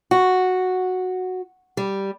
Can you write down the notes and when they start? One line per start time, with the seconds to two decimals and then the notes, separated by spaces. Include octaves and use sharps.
0.11 F#4
1.77 G3